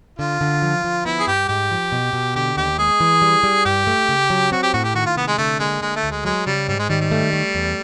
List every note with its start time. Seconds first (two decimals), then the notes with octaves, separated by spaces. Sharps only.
0.19 D3 F4
0.41 D3
0.62 F3
0.84 F3
1.05 B3 E4
1.20 G#4
1.27 G2 G4
1.48 G#2 G4
1.71 F3
1.92 B2
2.13 B2
2.36 D3 G4
2.57 D#2 G4
2.79 G#3 G#4
3.00 E3
3.22 G3
3.43 G3
3.65 G2 G4
3.87 A3
4.09 C#3
4.30 F#3
4.52 C4 F#4
4.63 G4
4.74 A2 F#4
4.84 G4
4.94 D#3 F#4
5.06 F4
5.16 C3 B3
5.27 G#3
5.38 D3 A3
5.59 G#3 A#3
5.81 D3 G#3
5.96 A3
6.03 D2
6.11 G#3
6.25 F#3 G#3
6.46 C#3 G3
6.68 G#2 G3
6.79 G#3
6.89 D#3 G3
7.01 G3
7.12 A3
7.33 A3
7.55 E2